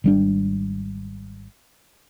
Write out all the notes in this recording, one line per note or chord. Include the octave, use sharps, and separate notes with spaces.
G#1 G3 D4